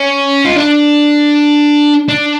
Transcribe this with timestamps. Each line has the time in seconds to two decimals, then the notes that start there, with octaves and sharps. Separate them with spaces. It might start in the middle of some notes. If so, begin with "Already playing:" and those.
Already playing: C#4
0.45 F4
0.56 D4
2.08 D4